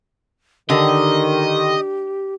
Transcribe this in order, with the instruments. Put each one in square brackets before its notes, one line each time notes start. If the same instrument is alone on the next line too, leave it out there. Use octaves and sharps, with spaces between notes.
[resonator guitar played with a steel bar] D3 [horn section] D#3 [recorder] G4 [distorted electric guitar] D#5